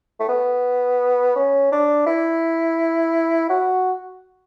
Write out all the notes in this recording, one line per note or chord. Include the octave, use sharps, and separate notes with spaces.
A3
B3
C#4
D4
E4
F#4